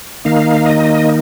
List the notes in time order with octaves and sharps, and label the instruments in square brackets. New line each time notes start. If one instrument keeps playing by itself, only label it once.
[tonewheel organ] D#3 A#3 D#4 F5
D#5